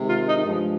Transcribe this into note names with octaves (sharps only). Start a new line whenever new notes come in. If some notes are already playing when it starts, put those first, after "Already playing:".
Already playing: C3 D#3 G#3
F4
D#4
G2 F3 G#3